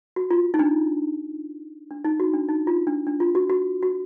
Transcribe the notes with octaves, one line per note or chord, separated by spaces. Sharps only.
F#4
F4
D#4
D4
D4
D#4
F#4
D4
D#4
F4
D4
D4
F4
F#4
F#4
F#4